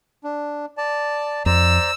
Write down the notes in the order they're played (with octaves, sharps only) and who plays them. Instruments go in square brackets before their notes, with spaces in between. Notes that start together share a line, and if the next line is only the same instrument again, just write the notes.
[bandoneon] D4
D5 A5
[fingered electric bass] F2 [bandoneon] C5 D5 A#5 [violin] E6